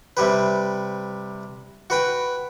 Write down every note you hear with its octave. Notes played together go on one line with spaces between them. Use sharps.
C3 G3 G4 B4
F#4 B4 G5